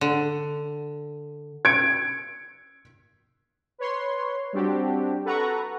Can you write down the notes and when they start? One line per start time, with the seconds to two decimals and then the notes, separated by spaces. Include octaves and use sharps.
0.01 D3
1.65 G#6 C#7 D7
3.78 B4 C#5 C6
4.53 G3 C4 D4 F#4 G4
5.25 A4 B4 F#5 A#5 C#6